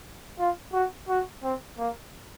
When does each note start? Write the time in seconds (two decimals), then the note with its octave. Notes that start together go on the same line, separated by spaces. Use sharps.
0.39 F4
0.73 F#4
1.09 F#4
1.43 C4
1.78 A#3